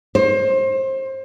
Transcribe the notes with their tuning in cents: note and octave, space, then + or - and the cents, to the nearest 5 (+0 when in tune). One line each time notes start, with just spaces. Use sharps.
C5 +30